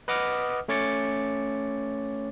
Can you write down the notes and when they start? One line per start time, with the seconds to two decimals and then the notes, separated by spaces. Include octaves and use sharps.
0.08 B4 D#5 F#5 D6 D#6 F6
0.68 A3 C#4 C#5 D6 A6 C#7